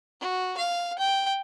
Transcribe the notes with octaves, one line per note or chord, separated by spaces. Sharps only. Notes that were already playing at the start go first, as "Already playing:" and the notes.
F#4
F5
G5